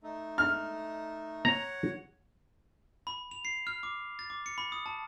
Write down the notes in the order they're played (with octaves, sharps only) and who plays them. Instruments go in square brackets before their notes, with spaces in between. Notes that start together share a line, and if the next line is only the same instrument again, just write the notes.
[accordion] A3 D#4
[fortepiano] F6
[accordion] C#5 F#5 [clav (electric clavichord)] A#5
[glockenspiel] B5
F7
C7
F6
D6
A6
D6
C#7
B5
D#6
A5